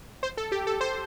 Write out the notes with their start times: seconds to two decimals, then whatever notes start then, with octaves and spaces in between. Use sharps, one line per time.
0.23 C5
0.37 A4
0.52 G4
0.67 A4
0.81 C5